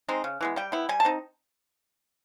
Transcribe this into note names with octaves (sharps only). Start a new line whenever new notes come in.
G#3 C4 D#4
C#3
E3 G#3 B3
G3 G5
B3 E4
G3 G#5
A5
C4 D#4